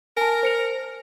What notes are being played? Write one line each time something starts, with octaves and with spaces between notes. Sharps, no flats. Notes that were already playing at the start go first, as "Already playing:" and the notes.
A#4 G#5 A5
C5 C#7 F7